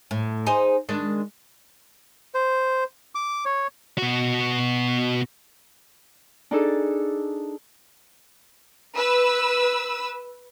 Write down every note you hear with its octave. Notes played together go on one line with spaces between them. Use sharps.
A2
D#4 G#4 C5
D#3 G#3 D4
C5
D6
C#5
B2 F#4
D4 D#4 G#4 A4
B4 E6